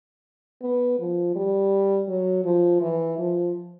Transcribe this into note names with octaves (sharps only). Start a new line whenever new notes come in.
B3
F3
G3
F#3
F3
E3
F3